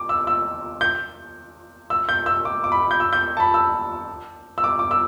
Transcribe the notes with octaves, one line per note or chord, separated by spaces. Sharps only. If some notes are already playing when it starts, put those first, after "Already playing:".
Already playing: D6
E6
E6
G6
E6
G6
E6
D6
D6
B5
G6
E6
G6
A5
B5
E6
E6
D6
D6
E6